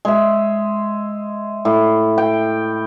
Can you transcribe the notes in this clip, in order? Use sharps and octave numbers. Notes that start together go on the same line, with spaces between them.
G#3 E5
A2
G5